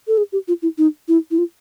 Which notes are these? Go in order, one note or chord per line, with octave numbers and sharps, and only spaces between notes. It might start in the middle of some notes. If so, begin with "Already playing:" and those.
A4
G#4
G4
F4
E4
D#4
E4
E4
F4